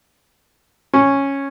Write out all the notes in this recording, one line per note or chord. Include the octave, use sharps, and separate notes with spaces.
C#4